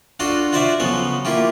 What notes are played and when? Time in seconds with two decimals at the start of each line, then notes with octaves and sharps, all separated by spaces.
0.20 D4 F4 F#4 A4 C6
0.53 F4 F#4 C5 D5 E5
0.80 C#3 F3 F#3 B3 A4
1.25 A#3 E4 F4 G4